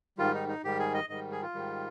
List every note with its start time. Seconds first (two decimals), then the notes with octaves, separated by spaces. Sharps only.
0.18 G#2 D#3 G3 F4
0.34 D#4
0.48 D#4
0.64 G#2 D#3 G3 G4
0.79 G#4
0.94 D#5
1.09 G#2 D#3 G3 D#5
1.31 G#4
1.42 F4
1.55 G#2 D#3 G3